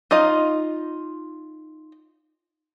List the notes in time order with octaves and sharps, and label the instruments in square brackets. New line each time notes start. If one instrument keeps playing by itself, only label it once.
[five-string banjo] D#4 F4 D#5